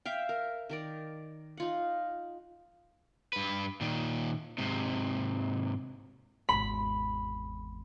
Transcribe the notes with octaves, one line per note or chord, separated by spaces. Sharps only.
E5 F5 G5
A#4
D#3 A#4 D5
D#4 F4 F#5
G2 B4
A#2 D#3
G#2 C3
G#1 E2 B5